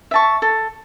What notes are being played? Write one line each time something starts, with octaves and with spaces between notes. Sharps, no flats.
E5 A5 C#6
A4